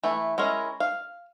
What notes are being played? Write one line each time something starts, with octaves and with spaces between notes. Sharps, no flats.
E3 A3
G#3 C#4 E4 A#4
F5